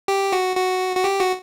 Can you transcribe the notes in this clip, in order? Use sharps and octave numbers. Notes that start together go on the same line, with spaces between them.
G4
F#4
F#4
F#4
G4
F#4